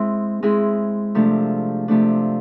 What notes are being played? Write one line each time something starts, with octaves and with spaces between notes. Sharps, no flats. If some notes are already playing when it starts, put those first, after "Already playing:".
Already playing: G#3 C4 E4
G#3 C4 E4 G#4
C3 F3 A3 D4
C3 F3 A3 D4